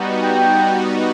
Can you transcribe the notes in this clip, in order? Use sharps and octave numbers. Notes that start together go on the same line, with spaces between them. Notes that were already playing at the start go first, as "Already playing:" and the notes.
Already playing: G3 B3 D#4 F#4
G5